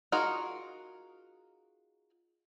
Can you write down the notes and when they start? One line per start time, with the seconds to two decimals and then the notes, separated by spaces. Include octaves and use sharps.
0.12 D#4 F4 F#4 G#4 A#4